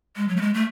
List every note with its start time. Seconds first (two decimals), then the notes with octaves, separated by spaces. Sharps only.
0.16 G#3
0.28 F#3
0.37 A3
0.42 G#3
0.54 A3